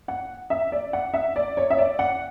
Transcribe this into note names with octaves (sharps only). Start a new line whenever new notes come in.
F#5
E5
D5
F#5
E5
D5
C#5
E5
D5
F#5